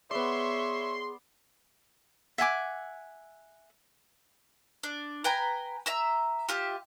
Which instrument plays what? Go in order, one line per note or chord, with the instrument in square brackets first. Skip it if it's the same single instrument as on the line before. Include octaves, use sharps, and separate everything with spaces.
[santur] B3 D5 [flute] G#4 [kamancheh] C#5 E5 [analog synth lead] C6
[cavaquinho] E5 F#5 G#5 D6
[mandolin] D4
B4 G5 G#5 A#5
E5 A#5 E6
F4 G4 E5